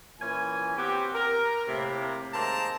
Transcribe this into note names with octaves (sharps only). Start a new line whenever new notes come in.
A#2 E3 C#4 G#5
B3 C4 F#4 G4
A#4
A2 C3 A#3
D#3 G#3 A#3 C4 A5 A#5